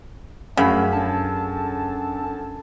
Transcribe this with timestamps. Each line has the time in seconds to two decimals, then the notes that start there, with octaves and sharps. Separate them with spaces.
0.57 F#2 C#3 A3 C#4 D4 B5
0.93 C#4 D4 A4 A5